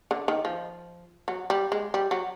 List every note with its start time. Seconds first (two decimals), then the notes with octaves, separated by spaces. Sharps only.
0.11 D3
0.28 D#3
0.45 F3
1.28 F#3
1.50 G3
1.72 G#3
1.94 G3
2.11 F#3